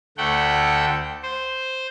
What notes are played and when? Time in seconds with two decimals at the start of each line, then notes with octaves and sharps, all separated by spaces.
0.18 D2 A3 F#5 G5
1.23 C5